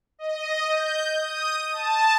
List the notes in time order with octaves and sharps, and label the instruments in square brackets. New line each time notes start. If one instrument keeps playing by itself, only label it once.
[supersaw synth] D#5
G6
D#6
A5